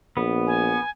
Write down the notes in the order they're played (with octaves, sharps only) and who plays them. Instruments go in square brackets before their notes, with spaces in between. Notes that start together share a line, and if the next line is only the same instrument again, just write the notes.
[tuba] A#1 [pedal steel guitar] B3
[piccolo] G#5